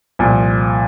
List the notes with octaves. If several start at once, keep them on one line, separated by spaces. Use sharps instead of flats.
C2 A#2 F3